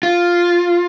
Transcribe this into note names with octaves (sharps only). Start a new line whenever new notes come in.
F4